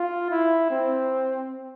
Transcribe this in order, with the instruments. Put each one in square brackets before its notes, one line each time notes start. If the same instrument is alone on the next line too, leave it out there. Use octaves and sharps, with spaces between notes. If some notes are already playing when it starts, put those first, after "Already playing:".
Already playing: [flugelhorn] F4
E4
C4